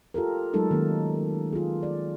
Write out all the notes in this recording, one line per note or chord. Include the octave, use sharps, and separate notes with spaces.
F4 G4 A4 A#4
F#3 G#3 A3 D#4 A4 A#4
D#3 A#3 C#4 D#4
F4 G#4
D5